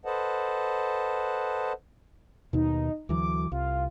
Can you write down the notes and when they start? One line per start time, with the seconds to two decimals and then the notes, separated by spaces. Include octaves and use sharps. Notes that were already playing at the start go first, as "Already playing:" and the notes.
0.05 A4 B4 C5 D#5 F#5 A5
2.53 D#2 B2 D#4
3.09 D2 E3 F#3 D6
3.52 C2 F4